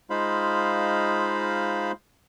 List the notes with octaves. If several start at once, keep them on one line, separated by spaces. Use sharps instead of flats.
G#3 D#4 F4 C5 F5 B5